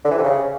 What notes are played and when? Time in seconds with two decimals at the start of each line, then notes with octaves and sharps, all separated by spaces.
0.05 D3
0.11 E3
0.17 C3
0.24 C#3